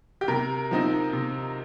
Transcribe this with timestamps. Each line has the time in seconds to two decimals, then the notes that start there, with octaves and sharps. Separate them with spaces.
0.21 G4
0.28 C3 A#4
0.71 F3 C4 D#4
1.13 C3